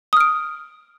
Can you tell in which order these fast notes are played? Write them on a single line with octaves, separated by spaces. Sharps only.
D#6 F6 D7